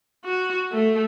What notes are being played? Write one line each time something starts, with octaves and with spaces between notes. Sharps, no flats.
F#4
A3